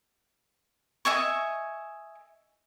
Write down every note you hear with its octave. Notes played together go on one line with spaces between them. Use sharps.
D#5 E5 G#5 C#6